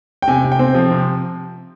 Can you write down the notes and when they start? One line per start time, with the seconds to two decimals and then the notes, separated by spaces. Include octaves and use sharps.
0.22 G5
0.28 C3 G#5
0.44 C3
0.52 G5
0.59 C4
0.75 F3
0.91 C3